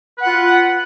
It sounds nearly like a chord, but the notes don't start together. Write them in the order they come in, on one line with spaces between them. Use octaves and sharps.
B4 F#5 F4